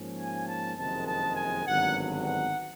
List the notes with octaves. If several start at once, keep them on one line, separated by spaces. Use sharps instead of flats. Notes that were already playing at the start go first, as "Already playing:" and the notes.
Already playing: G#2 F3 A#3 C#4
G#5
A5
F#1 F2 C3 D#3 G#3 A5
A5
G#5
G#1 G2 D3 F#3 B3 F#5
F#5